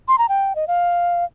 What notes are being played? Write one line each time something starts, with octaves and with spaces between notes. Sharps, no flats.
C6
A#5
G5
D#5
F5